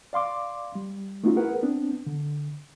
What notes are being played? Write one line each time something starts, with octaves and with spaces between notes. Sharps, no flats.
D5 F5 C6 D6
G3
A3 B3 C#4 D#4 F4 F#4
E4 G#4 A#4 B4 F#5
B3 C4 D4
D3